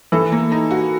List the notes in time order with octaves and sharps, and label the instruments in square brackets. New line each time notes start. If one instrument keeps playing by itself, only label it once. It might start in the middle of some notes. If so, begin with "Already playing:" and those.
[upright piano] E3 [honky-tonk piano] A4
[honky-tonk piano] A#3
D#4
F#4